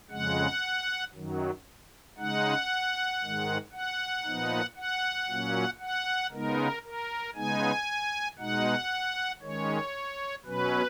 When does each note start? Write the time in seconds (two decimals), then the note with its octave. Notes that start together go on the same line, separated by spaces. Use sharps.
0.11 F2 C#3 G#3 F#5
1.14 F#2 D#3 F#3
2.17 C#3 G#3 D#4 F#5
3.21 G#2 D#3 G#3
3.73 F#5
4.25 A#2 F3 B3 D#4
4.76 F#5
5.28 A#2 F#3 A#3 C#4
5.80 F#5
6.32 C#3 G#3 B3 D#4 A#4
6.83 A#4
7.35 C#3 G#3 B3 D#4 G#5
8.39 B2 G#3 D#4 F#5
9.42 D#3 G#3 C#4 C#5
10.45 B2 F#3 C#4 B4